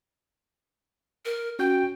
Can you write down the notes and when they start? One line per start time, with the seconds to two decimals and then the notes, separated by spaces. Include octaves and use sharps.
1.25 A#4
1.59 C#4 F#4 G5 G6